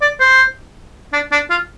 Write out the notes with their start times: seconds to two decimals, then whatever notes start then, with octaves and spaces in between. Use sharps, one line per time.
0.02 D5
0.20 C5
1.13 D4
1.32 D4
1.50 F4